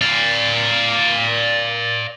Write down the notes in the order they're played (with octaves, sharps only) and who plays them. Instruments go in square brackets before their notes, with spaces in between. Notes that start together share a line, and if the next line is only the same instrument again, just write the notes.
[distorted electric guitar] D5 F5